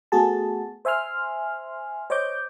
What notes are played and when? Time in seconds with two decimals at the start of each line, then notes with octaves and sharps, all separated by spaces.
0.12 A3 B3 F#4 G#4 A5
0.85 C5 E5 G#5 C6 F6
2.10 C5 C#5 D#5 D6 G6